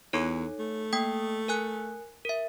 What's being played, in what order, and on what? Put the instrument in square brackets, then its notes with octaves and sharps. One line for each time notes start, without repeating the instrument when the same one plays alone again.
[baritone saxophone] E2 [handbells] D#4 A4 C#5
[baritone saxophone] A3
[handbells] A#3 G5 D#6
A#4 G#5 F#6
A#4 E5